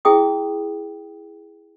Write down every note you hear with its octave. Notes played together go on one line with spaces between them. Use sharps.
E4 G#4 G5 D#6